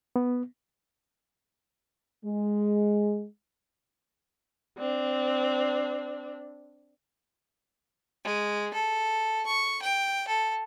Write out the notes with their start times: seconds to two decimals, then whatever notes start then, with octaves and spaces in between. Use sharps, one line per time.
0.16 B3
2.26 G#3
4.78 C4 D4
8.24 G#3
8.74 A4
9.46 C#6
9.82 G5
10.28 A4